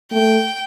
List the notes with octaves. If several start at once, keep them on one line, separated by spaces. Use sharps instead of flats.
A3 G5